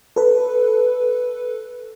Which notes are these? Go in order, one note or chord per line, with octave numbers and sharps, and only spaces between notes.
A4 B4